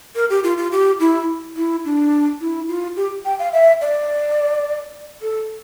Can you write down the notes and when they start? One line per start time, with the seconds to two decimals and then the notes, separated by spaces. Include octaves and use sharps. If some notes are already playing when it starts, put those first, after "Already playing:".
0.15 A#4
0.30 G4
0.44 F4
0.57 F4
0.72 G4
1.00 E4
1.56 E4
1.85 D4
2.41 E4
2.68 F4
2.96 G4
3.25 G5
3.39 F5
3.53 E5
3.81 D5
5.22 A4